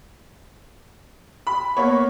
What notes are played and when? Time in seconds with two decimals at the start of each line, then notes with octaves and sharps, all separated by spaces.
1.47 B5
1.77 A#3 B3 C#5